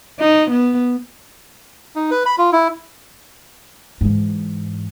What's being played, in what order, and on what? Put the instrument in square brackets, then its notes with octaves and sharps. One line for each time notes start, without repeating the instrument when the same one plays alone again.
[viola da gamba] D#4
B3
[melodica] D#4
B4
B5
F4
E4
[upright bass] G#2 E3